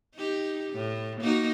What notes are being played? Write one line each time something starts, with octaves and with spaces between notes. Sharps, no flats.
D#4 G4
A2
A#3 D#4 F#4